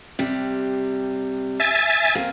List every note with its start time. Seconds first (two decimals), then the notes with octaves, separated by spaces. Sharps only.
0.19 C3 G3
1.60 E5 G#5 A6
2.15 A#3 C4